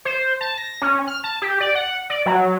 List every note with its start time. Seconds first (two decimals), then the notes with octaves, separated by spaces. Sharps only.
0.05 C5
0.41 A5
0.57 A#6
0.82 C#4
1.08 F6
1.24 A5
1.42 G4
1.60 D5
1.75 F#5
2.10 D5
2.26 F#3